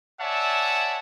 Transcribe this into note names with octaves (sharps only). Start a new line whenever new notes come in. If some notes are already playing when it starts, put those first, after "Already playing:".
C#5 D5 E5 F#5 G#5 A5